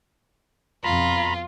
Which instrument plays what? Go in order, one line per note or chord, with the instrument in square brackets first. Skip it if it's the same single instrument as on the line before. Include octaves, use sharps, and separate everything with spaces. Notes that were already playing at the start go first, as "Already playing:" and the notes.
[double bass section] F2 B2 [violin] F4 [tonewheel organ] A#5 B5